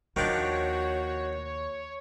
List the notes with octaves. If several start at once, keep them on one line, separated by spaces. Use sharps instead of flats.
D#2 D#3 F3 D4 F#4 C#5